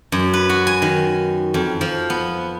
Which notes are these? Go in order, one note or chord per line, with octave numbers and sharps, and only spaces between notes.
F#2
B4
F#4
G#5
D#3
F2
F3
B3